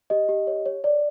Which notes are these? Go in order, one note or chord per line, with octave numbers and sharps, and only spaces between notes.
G4 D#5
G4
C#5
C#5
C#5 D5